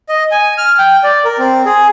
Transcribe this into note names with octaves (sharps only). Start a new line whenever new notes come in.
D#5
G#5
F6
G5
D5
A#4
C4
G#4